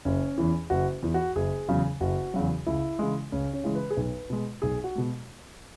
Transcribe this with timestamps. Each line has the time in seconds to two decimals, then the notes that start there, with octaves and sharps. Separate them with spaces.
0.05 F#1 C#4
0.38 E2 E3
0.70 F#1 F#4
1.03 E2 E3
1.14 F#4
1.36 F#1 G#4
1.68 E2 C#3 F#3
2.01 F#1 F#4
2.34 E2 C#3 F#3
2.66 C#2 E4
2.99 C#3 E3 G#3
3.32 C#2 C#4
3.53 C#4
3.64 C#3 E3 G#3
3.75 B4
3.90 G#4
3.97 B1 B4
4.30 B2 G#3
4.62 B1 G#4
4.84 F#4
4.95 B2 G#3